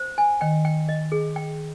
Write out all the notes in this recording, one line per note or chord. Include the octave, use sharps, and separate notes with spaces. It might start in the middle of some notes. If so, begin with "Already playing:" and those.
Already playing: C5
G#5
D#3 G5
G5
D#5
G#4
G5